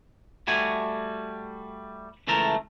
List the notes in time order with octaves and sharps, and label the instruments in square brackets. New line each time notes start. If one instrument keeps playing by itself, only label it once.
[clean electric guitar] G3 A3 F#4 G#5
C#2 E3 A3 A4 A#4